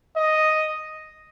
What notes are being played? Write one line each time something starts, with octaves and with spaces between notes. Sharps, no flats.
D#5